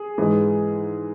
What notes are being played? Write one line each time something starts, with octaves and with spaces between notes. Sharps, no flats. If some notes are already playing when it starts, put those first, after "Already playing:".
Already playing: G#4
G#2 E3 G#3